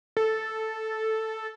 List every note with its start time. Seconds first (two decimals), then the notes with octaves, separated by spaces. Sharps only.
0.17 A4